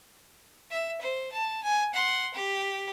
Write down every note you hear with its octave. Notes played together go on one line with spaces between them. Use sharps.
E5
C5
A5
G#5
F#5 C6
G4